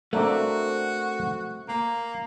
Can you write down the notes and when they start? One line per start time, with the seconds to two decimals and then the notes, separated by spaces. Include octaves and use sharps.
0.13 A3 A#3 C4 D4 F#4 E5
1.68 A#3 G5